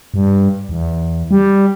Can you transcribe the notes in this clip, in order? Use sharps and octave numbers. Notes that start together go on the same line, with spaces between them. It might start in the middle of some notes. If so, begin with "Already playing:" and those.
G2
E2
G3